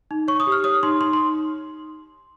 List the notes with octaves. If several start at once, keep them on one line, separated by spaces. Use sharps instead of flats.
D#4
C#5 C#6
D#6
G4
F6
C#5 D#6
D#4 C6
D#4 C6
C6